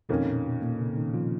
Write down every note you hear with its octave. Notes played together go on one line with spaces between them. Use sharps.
F2 B2 D#3 A#3 C#4
A#2
B2
A#2 A#3
C#3 C#4
D#3 D#4
F3 F4